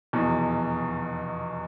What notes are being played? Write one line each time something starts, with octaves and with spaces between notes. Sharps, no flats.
F1 E2 B2